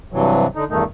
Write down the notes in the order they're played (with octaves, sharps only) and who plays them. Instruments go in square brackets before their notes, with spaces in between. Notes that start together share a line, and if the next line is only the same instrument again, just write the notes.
[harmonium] G2 C3 E3 F#3
D3 D#4
E2 G2 D#3 A3 D#4